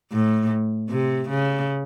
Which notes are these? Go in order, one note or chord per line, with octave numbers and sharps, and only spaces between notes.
A2
C3
C#3